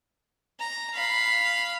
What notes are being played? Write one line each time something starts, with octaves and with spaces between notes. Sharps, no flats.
A#5
F5 B5